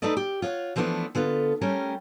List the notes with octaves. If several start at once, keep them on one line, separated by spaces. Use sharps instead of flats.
A3 D#4 A4 B4 D5 D#5
G4
F4 C#5 D5 F#5
E3 F3 A3 B3 D4 E4
D3 B3 F4 A4
G3 A3 C#4 G4 A#4